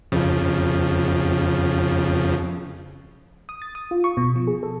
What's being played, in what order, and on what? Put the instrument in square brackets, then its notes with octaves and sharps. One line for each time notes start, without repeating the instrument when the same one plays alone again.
[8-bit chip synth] F2 C#3 F3
[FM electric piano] D#6
A6
D#6
F4
C#6
B2
F3
G#4
A4